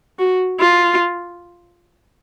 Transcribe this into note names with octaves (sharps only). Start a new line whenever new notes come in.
F#4
F4